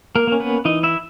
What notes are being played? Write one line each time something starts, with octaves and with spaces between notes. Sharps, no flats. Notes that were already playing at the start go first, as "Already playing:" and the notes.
A#3 A#4
A#3 C#4
B3 B4
E3 D#4 D#5
E4 E5